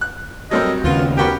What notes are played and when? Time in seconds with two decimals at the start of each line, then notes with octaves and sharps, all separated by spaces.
0.01 F#6
0.51 F#3 G3 C4 A4 A#4 D#5
0.84 D#2 C#3 B3 F4
1.18 B3 C#4 F#4 G4 A#4